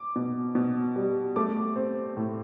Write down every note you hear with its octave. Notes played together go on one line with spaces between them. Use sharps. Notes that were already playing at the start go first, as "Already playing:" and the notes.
Already playing: D6
B2
B2
G3
A3 D6
C4
A2